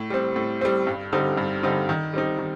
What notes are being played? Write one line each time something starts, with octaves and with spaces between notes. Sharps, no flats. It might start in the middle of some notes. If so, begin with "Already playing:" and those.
Already playing: A2
G3 C4
A2
G3 C4
G2
D3 G3 C4 D#4
G2
D3 G3 C4 D#4
D#3
G3 C4 D#4
D#3